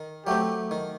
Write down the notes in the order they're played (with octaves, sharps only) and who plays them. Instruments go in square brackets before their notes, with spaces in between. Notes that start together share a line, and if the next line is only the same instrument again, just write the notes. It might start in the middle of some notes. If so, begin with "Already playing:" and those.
Already playing: [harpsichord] D#3
[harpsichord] F#3 A3 C4 [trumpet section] G4
[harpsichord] D#3